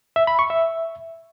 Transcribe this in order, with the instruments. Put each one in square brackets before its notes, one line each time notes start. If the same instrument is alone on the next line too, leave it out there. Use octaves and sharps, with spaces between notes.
[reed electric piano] E5
B5
C#6
E5